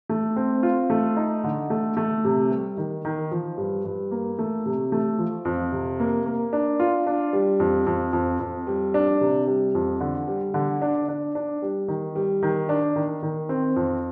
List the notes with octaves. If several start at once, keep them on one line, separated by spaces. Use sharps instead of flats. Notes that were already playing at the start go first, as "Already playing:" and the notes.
A3
C4
F4
A3
D#4
D3
A3
A3
C3
G3
D#3
D#3
F3
G2
G2
A#3
A3
C3
A3
F3
F2
C3
A#3
A#3
D4
F4
D4
G3
F2
F2
F2
F2
G3
D4
C3
G3
F2
D3
G3
D3
D4
D4
D4
G3
D#3
G3
D#3
D4
D#3
D#3
C4
F2